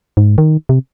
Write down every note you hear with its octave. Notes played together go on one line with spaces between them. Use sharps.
G#2
D#3
C3